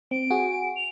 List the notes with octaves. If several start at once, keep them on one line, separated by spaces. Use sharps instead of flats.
C4 D7
F#4 G#4
F7